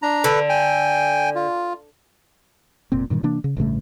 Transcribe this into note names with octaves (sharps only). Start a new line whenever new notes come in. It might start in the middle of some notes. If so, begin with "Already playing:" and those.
D4 A#5
D3 A4 B4
G5 G#5
F4
F1 A#2 C4
G2 A#2 D#3 G3
C3 E3 A#3 D4
C#3
A1 G2 C#3 A3